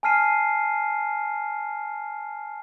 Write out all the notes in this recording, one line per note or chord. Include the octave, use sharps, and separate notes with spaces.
G#5 A5 F6 C7 D#7